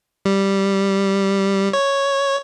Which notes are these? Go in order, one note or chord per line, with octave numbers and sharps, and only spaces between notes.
G3
C#5